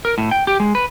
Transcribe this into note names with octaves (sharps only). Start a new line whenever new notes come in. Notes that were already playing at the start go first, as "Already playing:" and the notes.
A#4
A2
G5
G4
G#3
B4